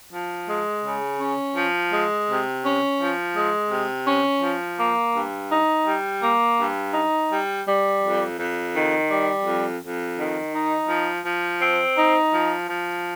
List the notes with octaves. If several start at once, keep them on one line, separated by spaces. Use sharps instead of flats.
F3
G#3
C#3
C#4
F3
G#3
C3
C#4
F3
G#3
C3
C#4
F3
A#3
G2
D#4
G3
A#3
G2
D#4
G3
G3
F2
F2
D#3
G3
F2
F2
D#3
D#4
F3
F3
C4
D#4
F3
F3